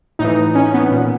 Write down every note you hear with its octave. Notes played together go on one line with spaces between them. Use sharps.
A2 E3 D#4
C#4
B3
A#2